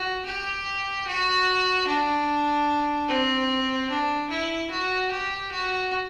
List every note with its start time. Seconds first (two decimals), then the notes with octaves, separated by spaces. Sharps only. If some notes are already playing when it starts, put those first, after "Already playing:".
Already playing: F#4
0.25 G4
1.07 F#4
1.87 D4
3.08 C4
3.89 D4
4.30 E4
4.70 F#4
5.11 G4
5.51 F#4